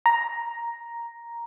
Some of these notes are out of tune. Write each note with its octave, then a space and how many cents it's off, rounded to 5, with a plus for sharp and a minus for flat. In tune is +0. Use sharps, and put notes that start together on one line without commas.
A#5 +5